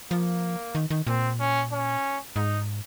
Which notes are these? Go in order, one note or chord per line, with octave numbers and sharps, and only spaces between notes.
F3 A#3
D#3
D#3
A#2 C4
C#4
C#4
G#2 D#4